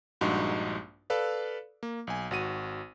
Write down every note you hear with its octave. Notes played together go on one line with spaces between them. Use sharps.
A#1 G2 G#3 D#4 F#4 C6
A4 B4 D5 F5
A#3
B1 G#5
G#1 F#4 D#7